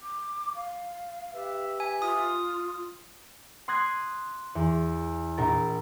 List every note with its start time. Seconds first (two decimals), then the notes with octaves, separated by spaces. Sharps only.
0.02 D6
0.55 F5
1.34 G4 B4 E5
1.80 G#5
2.02 F4 D#6
3.68 C6 D#6 F#6 G#6 A#6 C7
4.55 E2
5.37 A#1 A#4 A6